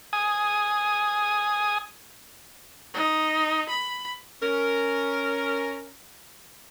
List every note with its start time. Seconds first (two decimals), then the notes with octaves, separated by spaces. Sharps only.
0.13 G#5 D#6
2.94 D#4
3.69 B5
4.42 C#4 A#4